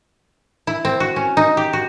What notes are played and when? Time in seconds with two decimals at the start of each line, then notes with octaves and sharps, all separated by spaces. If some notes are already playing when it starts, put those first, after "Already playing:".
0.67 E4
0.85 C4
1.00 F#4
1.16 C#4
1.37 D#4
1.57 G4
1.73 F#4